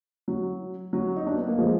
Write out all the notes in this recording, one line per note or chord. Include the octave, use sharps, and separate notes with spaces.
F#3
F#3
D#4
D4
B3
A#3
F3 G#3